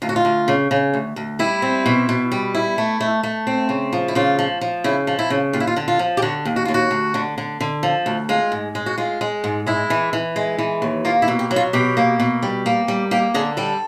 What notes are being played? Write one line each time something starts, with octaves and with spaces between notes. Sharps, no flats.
D2 F4
F#4
F4
D2
C#3
C#3
D2
D2
G3 E4
C4
B2
B2
G3
E4
A3
A3
A3
C4
C#3
F3
E4
C#3 F4
F3
F3
C#3 E4
F3
E4
C#3
D#2 F4
E4
F4
D3
F4
F3
G4
D3 F#4
D#2
F#4
D#2 F4
F#4
D2
D3
D3
D3
F3
D2
G#3 F4
G#2
G#3
F#4
G#3 F4
G#3
G#2
G#3 E4
E3
E3
G#3
E3
D#2
A#3 F4
E4
B2
G4
F#3
F4
B2 G4
A#3
B2
G3
A#3
G3
A#3 G4
D3 G#4
G3 A4